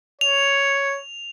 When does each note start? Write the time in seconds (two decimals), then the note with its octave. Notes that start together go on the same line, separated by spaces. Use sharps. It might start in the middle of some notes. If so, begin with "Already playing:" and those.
0.21 C#5 F7